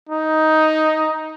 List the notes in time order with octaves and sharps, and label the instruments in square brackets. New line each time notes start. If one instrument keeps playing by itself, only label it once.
[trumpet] D#4